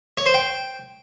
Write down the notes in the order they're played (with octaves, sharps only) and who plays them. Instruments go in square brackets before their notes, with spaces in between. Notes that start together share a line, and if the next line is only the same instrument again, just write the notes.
[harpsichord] C#5
C5
G5